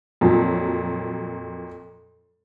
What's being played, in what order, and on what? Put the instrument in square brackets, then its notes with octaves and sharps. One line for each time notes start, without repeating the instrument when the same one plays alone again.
[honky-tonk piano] F2 A#2 F#3